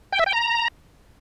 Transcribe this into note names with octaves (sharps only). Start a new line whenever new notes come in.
G5
E5
G5
A#5